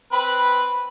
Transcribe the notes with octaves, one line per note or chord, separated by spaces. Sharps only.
C4 B4 B5